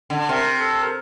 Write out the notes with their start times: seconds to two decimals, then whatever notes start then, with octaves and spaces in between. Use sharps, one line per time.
0.10 D3
0.29 C3 A#4
0.60 A4
0.82 A#4